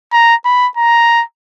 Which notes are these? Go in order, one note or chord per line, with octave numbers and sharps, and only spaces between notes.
A#5
B5
A#5